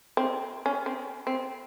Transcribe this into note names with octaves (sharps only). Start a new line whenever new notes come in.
C4
C#4
C4
C4